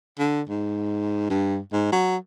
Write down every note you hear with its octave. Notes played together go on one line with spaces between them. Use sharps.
D3
G#2
G2
G#2
F#3